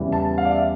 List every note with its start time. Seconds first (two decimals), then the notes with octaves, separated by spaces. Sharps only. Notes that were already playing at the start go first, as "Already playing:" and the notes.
Already playing: E2 C#3 E3 G3
0.13 A5
0.38 F5
0.45 D5
0.51 E5